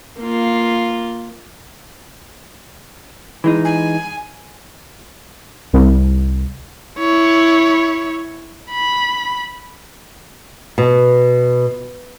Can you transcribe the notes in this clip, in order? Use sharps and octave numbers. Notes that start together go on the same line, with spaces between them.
A#3 F4
E3 G#3 D#4
G#5
C2
E4 C#5
B5
B2